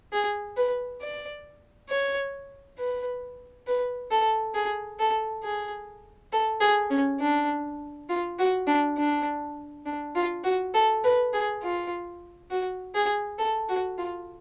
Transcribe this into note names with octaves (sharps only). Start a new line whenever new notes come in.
G#4
B4
D5
C#5
B4
B4
A4
G#4
A4
G#4
A4
G#4
C#4
D4
F4
F#4
D4
D4
D4
F4
F#4
A4
B4
G#4
F4
F#4
G#4
A4
F#4
F4